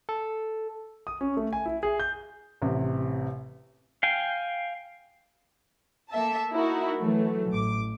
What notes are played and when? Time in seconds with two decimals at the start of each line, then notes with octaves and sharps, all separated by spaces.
0.09 A4
1.07 D#6
1.21 C#4
1.37 A3
1.53 G#5
1.66 E4
1.83 G#4
2.00 G6
2.62 A1 C3
4.03 F5 G5 G#5
6.09 A#3 A4 E5 A5
6.52 D#4 E4 F#4 A#4
6.99 E3 F#3 A3
7.51 A1 D6